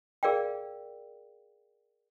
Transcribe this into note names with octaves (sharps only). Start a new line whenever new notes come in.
G#4 A#4 D5 F5 G5